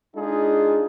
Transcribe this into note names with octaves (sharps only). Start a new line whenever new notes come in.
G#3 D4 D#4 F4 G#4